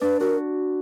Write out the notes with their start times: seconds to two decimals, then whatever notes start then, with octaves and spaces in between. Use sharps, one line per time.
0.01 D4 B4
0.20 F#4 A#4